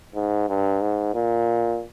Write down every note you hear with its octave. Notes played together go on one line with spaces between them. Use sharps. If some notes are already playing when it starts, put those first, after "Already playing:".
G#2
G2
G#2
A#2